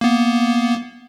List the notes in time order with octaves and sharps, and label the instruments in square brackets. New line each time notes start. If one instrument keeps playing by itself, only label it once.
[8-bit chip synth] A#3 B3